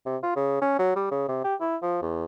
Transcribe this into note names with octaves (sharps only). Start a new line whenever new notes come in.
C3
F4
C#3
C#4
F#3
G3
C#3
C3
G4
E4
F3
E2